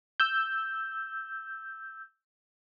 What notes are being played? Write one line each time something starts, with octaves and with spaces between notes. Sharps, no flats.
E6 G6